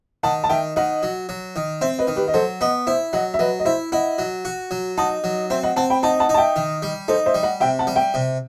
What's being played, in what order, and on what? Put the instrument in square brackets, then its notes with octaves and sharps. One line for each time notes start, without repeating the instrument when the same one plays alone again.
[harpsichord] D#3 [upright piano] F#5 A5
[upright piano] A5
[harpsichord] D#3 [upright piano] E5 G5
[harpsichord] D#3 [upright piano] D#5 F#5
[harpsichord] F#3
F#3
D#3
[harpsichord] C4 [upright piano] C5 E5
[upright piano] B4 D#5
[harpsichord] D#3
[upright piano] G4 B4
D#5
[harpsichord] F#3 [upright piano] A4 C5
[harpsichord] B3 [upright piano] D#5 F#5
[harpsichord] E4 [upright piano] C5 E5
[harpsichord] F#3 [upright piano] D#5 F#5
[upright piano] E5
[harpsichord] F#3 [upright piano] B4 D#5
[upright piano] D#5
[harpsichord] E4 [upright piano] C5 E5
[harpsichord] E4 [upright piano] D#5 F#5
[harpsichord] F#3
F#4
F#3
[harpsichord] D#4 [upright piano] F#5 A5
[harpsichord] F#3
[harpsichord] C4 [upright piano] C5 E5
[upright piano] D#5 F#5
[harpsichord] C4 [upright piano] F#5 A5
[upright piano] G5 B5
[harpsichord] D#4 [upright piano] F#5 A5
[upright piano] F#5 A5
[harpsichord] D#4
[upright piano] A5
E5 G5
[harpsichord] D#3
G3
[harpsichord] D#4 [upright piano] A4 C5
[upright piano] C5 E5
[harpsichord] G3
[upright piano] D#5 F#5
[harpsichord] C3 [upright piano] E5 G5
[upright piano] F#5 A5
[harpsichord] G3
[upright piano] E5 G5
[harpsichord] C3